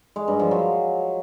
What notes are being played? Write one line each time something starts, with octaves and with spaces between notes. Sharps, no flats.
G#3
G2
F3
F#3